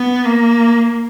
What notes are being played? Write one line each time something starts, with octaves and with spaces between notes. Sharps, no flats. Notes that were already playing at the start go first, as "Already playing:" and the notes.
Already playing: B3
A#3